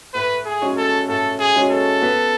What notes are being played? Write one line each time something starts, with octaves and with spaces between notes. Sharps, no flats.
A2 B4
G#4
G#3 C#4 F#4 C#5
A4
A2 A4
G#4
G#3 C#4 F#4 C#5
A4
B3